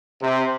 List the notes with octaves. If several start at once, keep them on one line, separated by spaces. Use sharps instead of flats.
C3